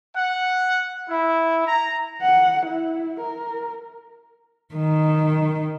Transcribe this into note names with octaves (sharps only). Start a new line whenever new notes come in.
F#5
E4
A#5
F#5
E4
A#4
D#3